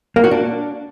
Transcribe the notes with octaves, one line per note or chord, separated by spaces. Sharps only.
A#3
F#4
D4